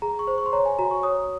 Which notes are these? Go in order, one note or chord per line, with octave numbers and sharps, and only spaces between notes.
G#4 A#5
C#6
C5
C#6
C6
C#5 A#5
G#5
F#4 A#5
C#6
C#5 D#6